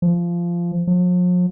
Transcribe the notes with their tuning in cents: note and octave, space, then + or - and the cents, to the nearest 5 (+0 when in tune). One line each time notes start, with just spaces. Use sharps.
F3 -15
F3 +45